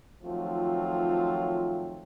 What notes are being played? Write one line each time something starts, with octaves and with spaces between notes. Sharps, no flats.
D#3 F3 F#3 A3 C4 F4